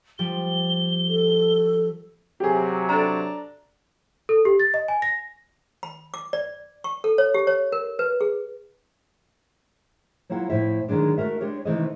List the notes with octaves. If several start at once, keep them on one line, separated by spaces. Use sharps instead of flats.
F3 G3 G7
A4
C3 F#3 G4 G#4
D4 A4 A#5
A4
G4
A6
D#5
G#5
A#6
B5
D6
D5
C#6
A4
C#5
G4
C#5
A#4
B4
G#4
F#3 A#3 E4 F4 F#5
A2 F3 E4 E5
D3 D#3 F#3 G#3 D4
A3 F#4 A#4 E5
G#3 D4 G4 C#5
C3 D#3 E3 A3 B4 D#5